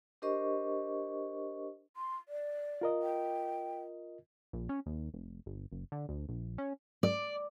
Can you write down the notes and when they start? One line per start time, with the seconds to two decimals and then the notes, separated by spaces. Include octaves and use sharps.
0.22 D4 G4 A#4 C5 D#5 C#6
1.95 C6
2.29 D5
2.81 F4 A#4 D#5
3.02 G5
4.53 A#1
4.69 C#4
4.86 D#2
5.14 F1
5.46 G1
5.72 F#1
5.92 D3
6.09 D2
6.29 A#1
6.58 C#4
7.03 D5